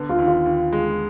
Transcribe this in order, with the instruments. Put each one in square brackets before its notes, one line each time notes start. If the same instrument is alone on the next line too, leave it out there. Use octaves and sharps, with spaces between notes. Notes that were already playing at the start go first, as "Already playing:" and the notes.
Already playing: [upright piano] D3 B3
[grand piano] F4
[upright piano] D#2
[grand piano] F4
[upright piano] D#2
G#3